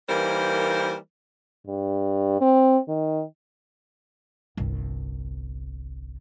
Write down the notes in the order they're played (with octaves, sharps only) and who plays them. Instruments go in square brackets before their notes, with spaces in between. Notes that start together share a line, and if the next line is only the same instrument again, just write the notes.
[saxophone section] E3 G3 A#3 D#4 A#4 C5
[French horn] G2
C4
D#3
[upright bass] G1 C2